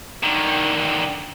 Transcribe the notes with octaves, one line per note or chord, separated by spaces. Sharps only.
D3 D#3